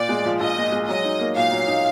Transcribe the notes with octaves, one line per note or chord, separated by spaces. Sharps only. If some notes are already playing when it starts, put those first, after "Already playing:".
Already playing: A#2 D5
G#3
F3
A#1 D#5
A#2
G#3
F#3 D#5
D#4
A#3
A#2 F5
F#3
D#4